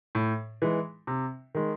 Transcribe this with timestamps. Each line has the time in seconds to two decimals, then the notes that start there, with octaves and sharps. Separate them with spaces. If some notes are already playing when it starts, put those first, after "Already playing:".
0.15 A2
0.62 E3 G#3
1.07 C3
1.54 D#3 G#3